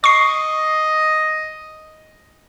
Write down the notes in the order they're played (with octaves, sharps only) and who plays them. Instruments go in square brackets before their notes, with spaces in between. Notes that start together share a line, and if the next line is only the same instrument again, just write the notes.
[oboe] D#5 [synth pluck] C#6 C7